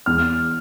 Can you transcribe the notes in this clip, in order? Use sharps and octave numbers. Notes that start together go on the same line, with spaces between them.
E2 F6